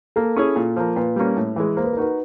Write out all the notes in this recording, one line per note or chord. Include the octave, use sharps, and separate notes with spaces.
A#3 A4
C#4 E4 G#4 C#5
A#2
F3 A#3
A#2 B4
G3 A#3 C#4
A2
E3 G#3
A#3 C5
B4
A#4
D#4 F#4 B4